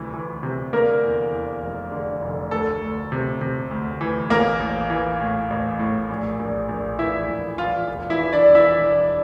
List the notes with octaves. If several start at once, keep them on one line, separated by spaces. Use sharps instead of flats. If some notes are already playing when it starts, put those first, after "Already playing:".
Already playing: D2 C3 E3
E3
C3
D3 A#3 A#4
E2
E2
F1
D3
F1
D2 A4
D2
C3
C3
D2
E3
A1 A#3 A#4
A1
E3
A2
A1
A2
A#1
A#1
A#1
E3 E4 E5
A#1
E3 F4 F5
E1
E4 E5
E3
D4 D5
E2
E4 E5
E1